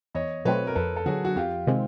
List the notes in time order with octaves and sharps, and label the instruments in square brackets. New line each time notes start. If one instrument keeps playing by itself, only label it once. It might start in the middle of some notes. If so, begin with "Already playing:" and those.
[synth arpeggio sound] E2 [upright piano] C#5 D#5
[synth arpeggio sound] B2 F#3 A3 C4 [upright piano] B4 C#5
[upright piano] A#4
[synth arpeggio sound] F2 [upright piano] A4 B4
[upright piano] A4
[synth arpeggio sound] D3 F#3 [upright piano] F#4 G#4
[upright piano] F#4
[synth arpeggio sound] F2 [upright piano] F4 G4
[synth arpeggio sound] C3 D#3 G#3 C4